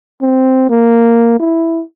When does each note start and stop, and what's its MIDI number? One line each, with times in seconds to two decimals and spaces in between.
0.21 0.67 60
0.70 1.38 58
1.40 1.82 64